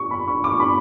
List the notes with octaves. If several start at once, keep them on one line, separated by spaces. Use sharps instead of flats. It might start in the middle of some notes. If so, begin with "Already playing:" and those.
Already playing: C#6
B5
C#6
D6
C#6
B5